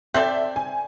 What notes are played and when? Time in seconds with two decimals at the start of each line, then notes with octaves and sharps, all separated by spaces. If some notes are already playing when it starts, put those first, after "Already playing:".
0.14 C4 A4 D5 E5 G6
0.56 G#5